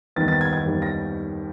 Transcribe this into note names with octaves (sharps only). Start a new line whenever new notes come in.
D#2 D#3 G3 B3 A6
A6
G#6
G#6
D#2 D#3 G3 B3
A#6